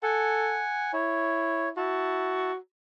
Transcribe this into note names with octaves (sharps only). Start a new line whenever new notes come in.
A4 F#5 G#5
E4 C#5
E4 F#4 A5